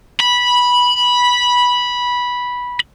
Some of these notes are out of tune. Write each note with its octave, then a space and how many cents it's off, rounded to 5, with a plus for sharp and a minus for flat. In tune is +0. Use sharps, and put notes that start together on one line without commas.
B5 -10